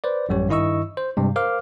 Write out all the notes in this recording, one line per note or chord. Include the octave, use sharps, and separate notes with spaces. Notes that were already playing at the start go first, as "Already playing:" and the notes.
B4 C5 D5
A1 F#2 G3 G4 C#5
G2 D#3 E4 D#5 C#6 E6
C5
G2 C3 G3 G#3
A#4 C5 F5 D6 F6